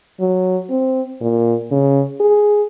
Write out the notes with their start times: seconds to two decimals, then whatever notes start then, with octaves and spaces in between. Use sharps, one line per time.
0.20 F#3
0.70 C4
1.21 A#2
1.72 C#3
2.20 G#4